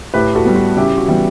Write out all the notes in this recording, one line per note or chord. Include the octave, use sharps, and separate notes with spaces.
A2 G4 B4
F#4 A4
G3 B3
F#4
C#3 E4 G4
F#4
E3 G3 B3